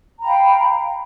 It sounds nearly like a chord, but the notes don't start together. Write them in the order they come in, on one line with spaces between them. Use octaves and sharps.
A#5 B5 G5 F5